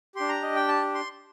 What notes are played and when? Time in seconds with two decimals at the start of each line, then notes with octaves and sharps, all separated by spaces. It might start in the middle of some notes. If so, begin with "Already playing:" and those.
0.15 D4 G4 C6
0.29 A#5
0.42 D#5
0.56 G5
0.68 A5
0.94 C6